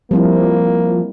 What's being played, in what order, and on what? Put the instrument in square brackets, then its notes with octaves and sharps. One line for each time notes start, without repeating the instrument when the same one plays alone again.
[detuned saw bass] F3 [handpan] G3 C4 E4 [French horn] A#3